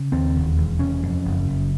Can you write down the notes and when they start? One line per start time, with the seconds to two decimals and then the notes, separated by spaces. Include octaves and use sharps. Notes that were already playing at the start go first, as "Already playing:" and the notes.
Already playing: C#3
0.12 D#2 C4
0.35 E1
0.57 E1
0.79 C3 C#4
1.03 F2
1.25 F#1
1.47 F#1